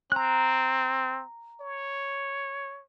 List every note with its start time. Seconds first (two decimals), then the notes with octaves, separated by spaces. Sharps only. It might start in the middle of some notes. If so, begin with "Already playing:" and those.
0.12 C4 A#5 F#6
1.61 C#5